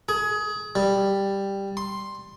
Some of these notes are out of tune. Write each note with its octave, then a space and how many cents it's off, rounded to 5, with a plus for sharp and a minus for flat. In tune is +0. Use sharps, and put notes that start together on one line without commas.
G#4 +20
G3 +5
C6 +5